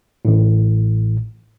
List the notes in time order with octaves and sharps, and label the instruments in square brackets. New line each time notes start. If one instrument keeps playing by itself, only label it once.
[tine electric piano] A1 A2